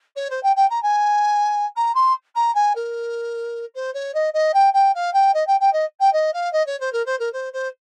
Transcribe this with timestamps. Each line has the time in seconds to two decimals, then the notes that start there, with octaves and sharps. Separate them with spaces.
0.16 C#5
0.30 C5
0.43 G5
0.56 G5
0.69 A#5
0.82 G#5
1.76 A#5
1.95 C6
2.35 A#5
2.55 G#5
2.75 A#4
3.75 C5
3.94 C#5
4.14 D#5
4.33 D#5
4.54 G5
4.73 G5
4.94 F5
5.13 G5
5.34 D#5
5.47 G5
5.60 G5
5.73 D#5
6.00 G5
6.13 D#5
6.33 F5
6.52 D#5
6.66 C#5
6.80 C5
6.92 A#4
7.05 C5
7.19 A#4
7.32 C5
7.53 C5